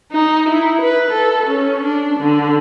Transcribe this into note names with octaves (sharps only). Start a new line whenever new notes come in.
D#4
E4
B4
A4
C#4
D4
D3